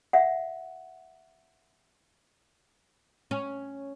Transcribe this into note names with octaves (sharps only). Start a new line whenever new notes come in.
E5 F#5
C#4